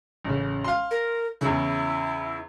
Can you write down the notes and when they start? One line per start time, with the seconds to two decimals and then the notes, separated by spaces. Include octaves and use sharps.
0.24 A1 C#3
0.64 F5 C6
0.91 A#4
1.41 E2 C#3 E4